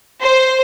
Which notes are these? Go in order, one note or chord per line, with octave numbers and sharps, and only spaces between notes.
C5